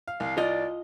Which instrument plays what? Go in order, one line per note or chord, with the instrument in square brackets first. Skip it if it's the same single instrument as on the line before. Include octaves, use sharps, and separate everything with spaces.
[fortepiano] F5
[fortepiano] C2 [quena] F5
[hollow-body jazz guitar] F4 D#5 [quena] D5